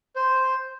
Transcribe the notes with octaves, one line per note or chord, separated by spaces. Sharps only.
C5